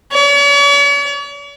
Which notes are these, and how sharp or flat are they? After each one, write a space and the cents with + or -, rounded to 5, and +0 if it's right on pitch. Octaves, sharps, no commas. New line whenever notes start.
C#5 +45